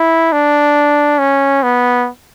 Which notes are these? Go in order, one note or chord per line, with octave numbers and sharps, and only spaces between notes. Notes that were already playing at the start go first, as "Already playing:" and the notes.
Already playing: E4
D4
C#4
B3